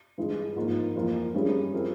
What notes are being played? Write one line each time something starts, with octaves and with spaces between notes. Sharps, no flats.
G2 E3 G#3
G#2 F3 A#3 F4
F2 E3 A#3 F4
G2 G3 C#4 E4 G#4
F3 C4 E4 A#4